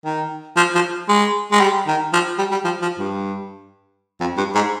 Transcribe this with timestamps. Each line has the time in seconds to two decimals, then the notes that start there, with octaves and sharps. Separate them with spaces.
0.05 D#3
0.56 F3
0.75 F3
1.09 G#3
1.52 G#3
1.60 G3
1.87 D#3
2.13 F3
2.38 G3
2.51 G3
2.64 F3
2.82 F3
2.99 G2
4.20 F2
4.37 G2
4.55 G#2